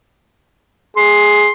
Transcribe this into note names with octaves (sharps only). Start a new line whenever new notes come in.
G#4 C6